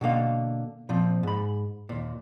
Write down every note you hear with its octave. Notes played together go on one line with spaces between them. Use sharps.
B2 D3 A#3 F5
A#2 F3 C4
G#2 B5
D#2 A#2